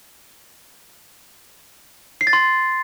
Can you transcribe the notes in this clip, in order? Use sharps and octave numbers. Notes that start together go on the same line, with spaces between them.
C7
A6
C6